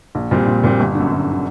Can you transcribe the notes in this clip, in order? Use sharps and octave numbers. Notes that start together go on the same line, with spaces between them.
A#1
A#2 G3 C4
A#1
A#2 G3 C4
G1
D3
F#2
G1
D3